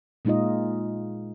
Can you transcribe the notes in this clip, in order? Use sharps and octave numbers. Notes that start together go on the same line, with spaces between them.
A#2 G#3 D#4 F4 D#5